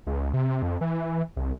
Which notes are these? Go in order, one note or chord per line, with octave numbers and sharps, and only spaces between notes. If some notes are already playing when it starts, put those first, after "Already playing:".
C#2
C3
F2
E3
C2